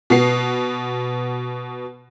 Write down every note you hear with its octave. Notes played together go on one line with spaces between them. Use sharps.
B2 B3 C7